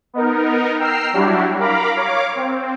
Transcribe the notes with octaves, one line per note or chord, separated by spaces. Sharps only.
B3 D#4 A#4
G5 A#5 E6 F6 C7
F#3 G3 D4 E4 F#4 G4
A#4 F5 A#5 B5 D6
C#5 F5 D6
C4